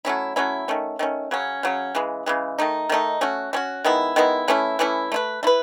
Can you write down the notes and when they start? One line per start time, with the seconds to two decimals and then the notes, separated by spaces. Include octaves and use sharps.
0.05 F#3 A3 C#4 E4
0.36 F#3 A3 C#4 E4
0.68 D#3 A3 C#4
0.99 D#3 A3 C#4
1.31 C#3 F#3 C#4
1.63 C#3 F#3 C#4
1.95 C#3 E3 G#3
2.26 C#3 E3 G#3
2.59 D#3 A3 D#4
2.89 D#3 A3 D#4
3.21 A3 C#4 F#4
3.53 A3 C#4 F#4
3.85 D#3 G#3 B3 E4
4.16 D#3 G#3 B3 E4
4.48 E3 A3 C#4 E4
4.79 E3 A3 C#4 E4
5.12 A3 E4 B4
5.43 A3 E4 B4